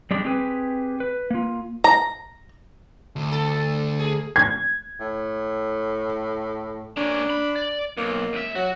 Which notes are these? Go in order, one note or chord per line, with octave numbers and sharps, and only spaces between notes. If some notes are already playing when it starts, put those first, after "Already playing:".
G3 G#3 D4 G4
C4 G4 G#4 B4
B4
A#3 F4
A#5
D2
A4
G#4
G#6
A2
A#3 C#4 D4
B5
D5
B1 A#3
C#2 E5
F#3 F#4